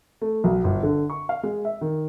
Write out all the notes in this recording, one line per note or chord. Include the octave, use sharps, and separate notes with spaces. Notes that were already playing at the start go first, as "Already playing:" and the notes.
A3
B1
G1
D3
C#6
F5
G#3
E5
D#3